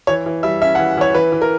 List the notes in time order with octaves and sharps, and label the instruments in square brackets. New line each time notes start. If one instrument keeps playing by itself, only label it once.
[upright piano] E3 C#5
E3
G3 E5
C#4 E5
F#5
E3
E3 C#5
E3 B4
E3
A#4